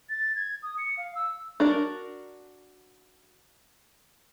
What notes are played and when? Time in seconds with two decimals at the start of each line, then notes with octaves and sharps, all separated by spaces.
0.09 A6
0.36 G#6
0.63 D#6
0.78 C#7
0.97 F5
1.15 E6
1.60 D4 F#4 A#4 D5